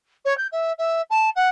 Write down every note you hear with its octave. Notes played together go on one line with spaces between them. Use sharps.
C#5
G6
E5
E5
A5
F#5